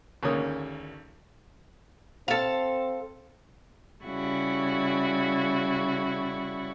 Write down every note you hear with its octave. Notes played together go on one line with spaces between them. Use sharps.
G#1 D2 C#3 A#3 C#5 D#6
C4 A4 F5
C#3 G3 E4 F#4 C#6